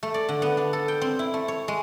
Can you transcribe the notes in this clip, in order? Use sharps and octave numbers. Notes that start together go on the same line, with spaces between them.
A3
D5
D3
B3
D4
A4
G5
C4
E4
A3
C#5
G#3